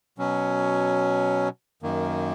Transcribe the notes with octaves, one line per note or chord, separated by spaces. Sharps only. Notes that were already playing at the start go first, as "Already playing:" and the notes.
B2 F#3 C#4
F#2 D#3 A#3